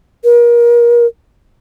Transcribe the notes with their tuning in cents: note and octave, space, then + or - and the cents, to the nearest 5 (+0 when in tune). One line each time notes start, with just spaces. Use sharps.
A#4 +30